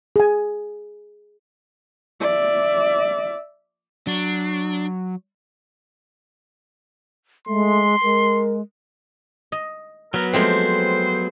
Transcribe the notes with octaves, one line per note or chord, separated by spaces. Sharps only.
G#4 G#5
D5 E5
F#3 D4
G#3 A3 C6
G#3 A#4
D#5
F#3 B3 A#4
F3 G#3 A3 C4 C5